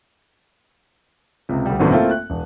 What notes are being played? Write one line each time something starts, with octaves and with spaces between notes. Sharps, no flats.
C#2 C3
D2 G3
G#1 F#2 B2 D3 E3 F#3
A3 A#3 C4 E4 F4 A4
F#6
E1